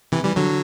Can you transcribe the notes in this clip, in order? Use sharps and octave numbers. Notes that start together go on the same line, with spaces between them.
C3 E3
E3 G3
D3 F#3